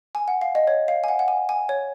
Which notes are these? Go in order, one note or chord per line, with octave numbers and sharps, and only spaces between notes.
G#5
F#5
F5
D#5
C#5
F5
G#5
F#5
F#5
G#5
G#5
C#5